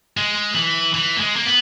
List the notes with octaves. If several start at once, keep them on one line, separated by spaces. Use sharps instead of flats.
G#3
E3
E3
A#3
G#3
A#3
B3